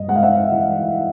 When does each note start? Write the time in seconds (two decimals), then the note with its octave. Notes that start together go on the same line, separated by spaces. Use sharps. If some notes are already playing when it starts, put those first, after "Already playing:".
Already playing: G2 D#5
0.08 G#3 F#5
0.15 F5
0.23 E5 F#5
0.52 E3